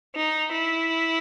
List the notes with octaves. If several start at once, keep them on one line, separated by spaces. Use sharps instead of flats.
D#4
E4